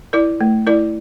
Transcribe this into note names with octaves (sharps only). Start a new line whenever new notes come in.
E4 A#4 D5
A3
E4 A#4 D5